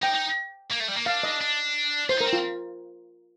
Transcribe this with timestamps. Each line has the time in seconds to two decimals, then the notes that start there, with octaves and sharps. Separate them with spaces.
0.02 D#4 G5
0.14 D#4
0.71 A#3
0.80 A3
0.88 G3
0.97 A#3
1.06 D4 F5
1.23 D#5
1.41 D4
2.09 F4 C5
2.18 D#4
2.21 A#4
2.26 C4
2.33 F4